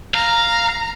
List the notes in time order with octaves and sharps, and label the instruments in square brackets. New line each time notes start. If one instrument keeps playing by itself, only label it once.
[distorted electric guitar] F5 [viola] A#5